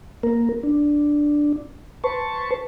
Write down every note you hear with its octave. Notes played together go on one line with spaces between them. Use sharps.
A#3 A#4
D4
B4 C5 A5 C#6